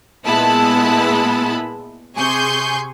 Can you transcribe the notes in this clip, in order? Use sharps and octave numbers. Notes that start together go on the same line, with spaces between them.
A#2 G#3 B3 E4 A5 B5
C3 G#4 G#5 C6 C#6 G6